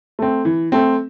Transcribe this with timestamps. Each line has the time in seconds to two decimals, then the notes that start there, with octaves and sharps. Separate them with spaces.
0.19 A3 C4
0.45 E3
0.72 A3 C4